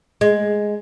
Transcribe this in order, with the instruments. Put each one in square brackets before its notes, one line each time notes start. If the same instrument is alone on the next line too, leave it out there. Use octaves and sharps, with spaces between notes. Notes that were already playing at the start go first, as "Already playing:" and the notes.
[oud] G#3